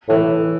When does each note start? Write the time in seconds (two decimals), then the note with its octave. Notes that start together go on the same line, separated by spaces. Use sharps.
0.09 A2 E3